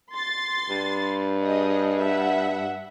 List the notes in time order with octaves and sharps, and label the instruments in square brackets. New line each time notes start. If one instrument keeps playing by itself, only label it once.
[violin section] C6 A6
[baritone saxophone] G2
[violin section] G#4 D#5
E5 F#5